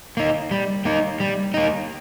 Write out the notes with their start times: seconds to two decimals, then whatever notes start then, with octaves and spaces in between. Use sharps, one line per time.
0.17 A#3 D#4
0.51 G3
0.85 A#3 D#4
1.20 G3
1.54 A#3 D#4